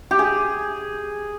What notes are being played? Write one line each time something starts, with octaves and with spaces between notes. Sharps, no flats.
G4
G#4